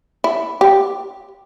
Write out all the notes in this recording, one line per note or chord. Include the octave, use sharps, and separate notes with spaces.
E4
G4